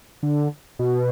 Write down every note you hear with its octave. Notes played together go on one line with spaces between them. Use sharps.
D3
B2